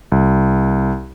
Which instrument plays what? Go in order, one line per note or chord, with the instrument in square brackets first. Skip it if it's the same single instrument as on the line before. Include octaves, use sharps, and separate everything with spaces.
[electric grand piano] C2